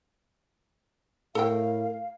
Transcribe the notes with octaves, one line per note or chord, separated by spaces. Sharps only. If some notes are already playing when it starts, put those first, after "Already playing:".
A2 A4 A#4 F5 G5